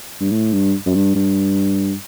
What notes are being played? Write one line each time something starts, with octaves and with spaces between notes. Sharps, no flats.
G2
A2
G2
F#2
G2
G2